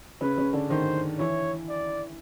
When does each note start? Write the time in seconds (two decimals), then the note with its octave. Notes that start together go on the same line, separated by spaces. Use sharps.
0.21 C#3 C#4 B4
0.38 C#3 C#4
0.53 D3 D4
0.70 D#3 D#4 C5
1.19 E3 E4 C#5
1.69 D5